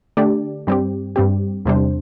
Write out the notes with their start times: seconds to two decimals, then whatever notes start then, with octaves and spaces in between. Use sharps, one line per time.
0.17 D3 A3 D4 G4 D5
0.67 G2 G3 C4 G4
1.16 G2 G3 C4 G4
1.65 E2 C3 G3 D4 C5